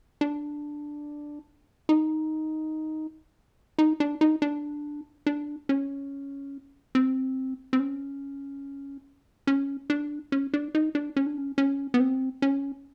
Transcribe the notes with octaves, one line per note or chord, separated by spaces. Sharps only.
D4
D#4
D#4
D4
D#4
D4
D4
C#4
C4
C4
C#4
C#4
D4
C#4
D4
D#4
D4
C#4
D4
C#4
C#4
B3
C4
C#4